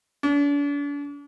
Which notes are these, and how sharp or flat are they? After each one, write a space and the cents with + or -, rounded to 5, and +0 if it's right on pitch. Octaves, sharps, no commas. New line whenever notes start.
D4 -40